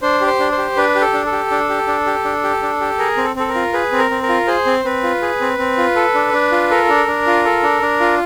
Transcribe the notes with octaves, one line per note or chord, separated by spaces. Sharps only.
D4 C5
G4
C5
D4
C5
G4
D4 B4
G4
A4
D4
A4
G4
D4
G4
D4
G4
D4
G4
D4
G4
G#4 A#4
C4
A4
C4 A4
A#4
F4
G#4 B4
C4
A#4
C4
A#4
F4
G#4 C5
C4
C4 B4
F4
G#4
C4
C4
F4
A4
D4
D4
F4
A4 A#4
D4
D4
F4
A4
D4
D4
F4